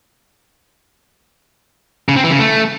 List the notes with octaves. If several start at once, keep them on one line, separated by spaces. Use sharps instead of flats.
C#3
C4
E3
C#3
A3